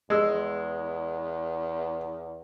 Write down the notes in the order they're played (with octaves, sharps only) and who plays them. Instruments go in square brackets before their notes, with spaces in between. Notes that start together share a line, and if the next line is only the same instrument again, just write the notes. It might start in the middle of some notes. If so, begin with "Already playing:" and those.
[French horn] E2 [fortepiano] G#3 E6